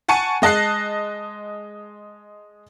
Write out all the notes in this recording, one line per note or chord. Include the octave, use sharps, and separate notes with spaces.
F#5 G#5 A5 C#6 C#7 D#7
G#3 D#5 A5 F#6 C7